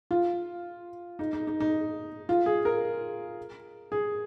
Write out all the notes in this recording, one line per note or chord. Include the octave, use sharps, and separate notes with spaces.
F4
D#4
D#4
D#4
D#4
F4
G#4
A#4
G#4